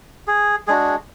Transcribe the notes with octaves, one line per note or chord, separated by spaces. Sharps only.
G#4
G#3 D4 F#4 G#4